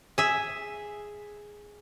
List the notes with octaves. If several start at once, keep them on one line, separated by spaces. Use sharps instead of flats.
G#4 E5